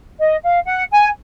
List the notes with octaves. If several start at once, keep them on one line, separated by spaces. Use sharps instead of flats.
D#5
F5
F#5
G#5